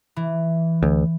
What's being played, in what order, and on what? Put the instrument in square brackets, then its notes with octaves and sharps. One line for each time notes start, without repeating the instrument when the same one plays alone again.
[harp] E3
[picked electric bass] D2